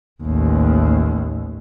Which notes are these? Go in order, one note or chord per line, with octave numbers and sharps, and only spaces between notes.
A1 D#2